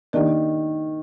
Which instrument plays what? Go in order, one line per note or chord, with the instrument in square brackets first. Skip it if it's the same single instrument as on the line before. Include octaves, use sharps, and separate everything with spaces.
[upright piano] D#3 [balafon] A#3 D4 G4 A#4 D5